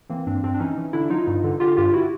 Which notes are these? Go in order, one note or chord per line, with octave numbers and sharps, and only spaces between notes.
E3 A#3 C4
G2 C4 D4
G2 C4 D4
D4
E3 C#4 D#4
E3
D3 D4 E4
F#3 D#4 F4
G2
D3
D3 F4 G4
G2 F4 G4
E4 F#4